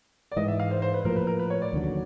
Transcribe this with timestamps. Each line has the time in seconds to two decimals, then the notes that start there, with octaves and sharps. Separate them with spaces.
0.32 D5
0.36 G#2 E3 G#3 D#5
0.48 E5
0.60 F5
0.71 C5
0.82 C5
0.94 B4
1.05 A2 F3 A#3 A#4
1.16 B4
1.27 A#4
1.39 B4
1.50 C#5
1.62 D5
1.73 D#2 D3 F#3